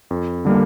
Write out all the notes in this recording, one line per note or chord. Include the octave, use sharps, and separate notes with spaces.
F2
D3 G3 A#3